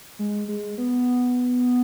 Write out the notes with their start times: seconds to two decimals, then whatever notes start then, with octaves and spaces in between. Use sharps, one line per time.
0.19 G#3
0.48 G#3
0.78 B3